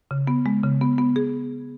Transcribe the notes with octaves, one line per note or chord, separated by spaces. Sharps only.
C#3
B3
G#3
C#3
B3
B3
G#4